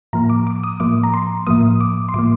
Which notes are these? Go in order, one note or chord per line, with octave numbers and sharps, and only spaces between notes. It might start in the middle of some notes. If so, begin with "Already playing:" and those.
A2 F3 A#3 A#5
D6
D6
D#6
A2 F3 A#3 D6
A#5
C6
A2 F3 A#3 D#6
D6
C6
A2 F3 A#3 D6